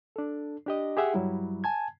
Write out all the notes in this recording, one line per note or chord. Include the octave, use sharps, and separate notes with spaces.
D4 A4
D4 G4 D#5
G4 G#4 E5 F#5
G2 F#3 G3 E4
G#5 A5 G#6